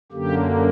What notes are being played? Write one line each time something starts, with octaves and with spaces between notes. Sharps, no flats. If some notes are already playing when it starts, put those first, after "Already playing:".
F#2 D3 A#3 G4